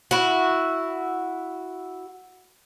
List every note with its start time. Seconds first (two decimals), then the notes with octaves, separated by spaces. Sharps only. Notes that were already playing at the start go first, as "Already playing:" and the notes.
0.11 E4 F#4